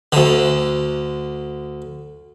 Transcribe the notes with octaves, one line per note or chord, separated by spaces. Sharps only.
D2 D3